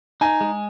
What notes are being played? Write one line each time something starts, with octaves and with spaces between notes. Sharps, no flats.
D#4 G#5
G#3